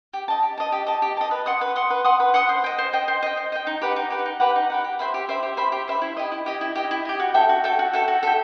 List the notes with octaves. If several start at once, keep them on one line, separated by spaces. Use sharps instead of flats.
G4
D#5 A5
G4
D#5 A5
G4
D#5 A5
G4
D#5 A5
B4
F#5 C6 D#6
B4
F#5 C6 D#6
B4
F#5 C6 D#6
B4
F#5 C6 D#6
C5
D#5 G5
C5
D#5 G5
C5
D#5 G5
C5
D#5 G5
D#4
G4 B4 F#5
D#4
G4 B4 F#5
D#4
G4 B4 F#5
D#4
G4 B4 F#5
G4
C5 E5 B5
G4
C5 E5 B5
G4
C5 E5 B5
G4
C5 E5 B5
E4
G4 D#5
E4
G4 D#5
E4
G4 D#5
E4
G4 D#5
F#4
A4 E5 G5
F#4
A4 E5 G5
F#4
A4 E5 G5
F#4
A4 E5 G5